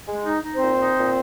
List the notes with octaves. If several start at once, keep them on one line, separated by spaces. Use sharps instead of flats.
G#3
D#4
D#4
C4 C5
A#2
D#4
A#2